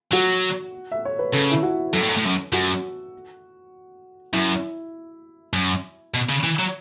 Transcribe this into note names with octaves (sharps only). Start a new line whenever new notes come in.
F#3 F#4
E5
C#5
B4
C#3 A4
E4
F#4
F#2 A4
A2
F#2
A2
F#2
F#2 F#4
F#2 E4
F#2
B2
C#3
E3
F#3